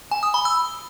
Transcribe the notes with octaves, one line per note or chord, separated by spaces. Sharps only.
G#5
D#6
B5
E6